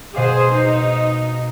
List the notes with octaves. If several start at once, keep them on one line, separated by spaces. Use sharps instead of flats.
B2 G#4 C5 F5 D6
D#4